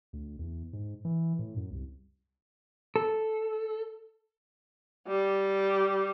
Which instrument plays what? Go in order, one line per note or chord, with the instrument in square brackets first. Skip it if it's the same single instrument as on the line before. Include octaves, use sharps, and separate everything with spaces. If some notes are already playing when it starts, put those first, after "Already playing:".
[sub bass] D2
E2
G#2
E3
A2
F#2
C2
[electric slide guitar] A4
[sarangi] G3